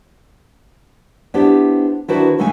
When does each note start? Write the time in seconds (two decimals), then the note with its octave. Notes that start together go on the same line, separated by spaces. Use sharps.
1.34 B3 D4 E4 G4 C5
2.08 D#3 D4 E4 F#4 B4 C5
2.38 D2 C#3 G#3 A3 D#4 G#5